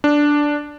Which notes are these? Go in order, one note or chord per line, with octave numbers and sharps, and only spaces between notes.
D4